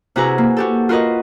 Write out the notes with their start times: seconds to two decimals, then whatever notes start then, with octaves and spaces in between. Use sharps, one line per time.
0.16 C3 E4 F#4 G#4 B4 A#5
0.38 A#3
0.57 F#4 G4 A4
0.89 F4 F#4 A#4 B4 D#5